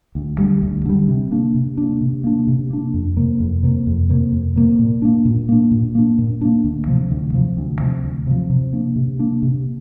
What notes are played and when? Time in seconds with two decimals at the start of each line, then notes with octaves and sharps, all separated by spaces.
0.15 D2
0.38 D3 G3
0.62 D2
0.85 D3 G3
1.08 C3
1.31 A#3 D4
1.55 C3
1.77 A#3 D4
2.01 C3
2.24 A#3 D4
2.47 C3
2.70 A#3 D4
2.94 F2
3.17 C3 A#3
3.40 F2
3.63 C3 A#3
3.86 F2
4.09 C3 A#3
4.32 F2
4.56 C3 A#3
4.79 A#2
5.02 A#3 D4
5.25 A#2
5.49 A#3 D4
5.71 A#2
5.95 A#3 D4
6.18 A#2
6.41 A#3 D4
6.64 D2
6.87 C3 F3
7.11 D2
7.34 C3 F3
7.57 D2
7.80 C3 F3
8.04 D2
8.27 C3 F3
8.50 C3
8.73 A#3 D4
8.96 C3
9.19 A#3 D4
9.42 C3